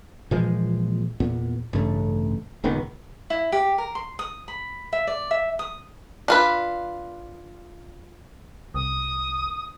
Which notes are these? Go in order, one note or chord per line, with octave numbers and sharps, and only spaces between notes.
A#2 E3 F3 G#3
E2 A#2 B3
A1 G2 C#3 A3
D#1 C#2 D#3 B3
E4
G4
A#4
C6
D#6
B5
E5
D5
E5
D#6
D4 F4 B4
C2 D#6